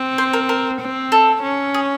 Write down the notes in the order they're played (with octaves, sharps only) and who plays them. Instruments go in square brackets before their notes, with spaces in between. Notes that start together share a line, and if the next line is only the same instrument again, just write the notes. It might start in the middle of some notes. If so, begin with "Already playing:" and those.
Already playing: [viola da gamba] C4
[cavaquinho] C5
A#4
A#4
[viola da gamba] C4
[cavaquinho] A4
[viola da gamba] C#4
[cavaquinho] G#4